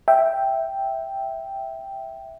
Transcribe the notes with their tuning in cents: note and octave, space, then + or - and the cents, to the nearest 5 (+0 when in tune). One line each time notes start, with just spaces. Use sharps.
E5 +0 G5 +0